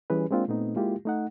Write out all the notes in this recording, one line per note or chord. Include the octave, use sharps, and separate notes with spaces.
E3 G3 C#4 G#4 B4
G#3 A#3 C4 D4 F4
A#2 A3 B3 C4 D#4
G#3 A#3 E4 F4 G4
A3 D#4 F#5